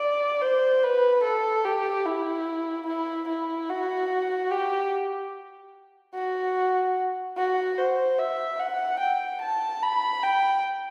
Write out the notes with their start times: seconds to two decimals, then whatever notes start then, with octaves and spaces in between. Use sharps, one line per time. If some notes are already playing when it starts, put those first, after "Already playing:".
Already playing: D5
0.42 C5
0.83 B4
1.23 A4
1.65 G4
2.06 E4
2.87 E4
3.29 E4
3.69 F#4
4.51 G4
6.14 F#4
7.37 F#4
7.78 C5
8.19 E5
8.60 F#5
9.00 G5
9.42 A5
9.83 B5
10.23 G5